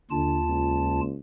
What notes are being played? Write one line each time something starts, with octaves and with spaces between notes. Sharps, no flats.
D#2 D3 F4 A5
C#2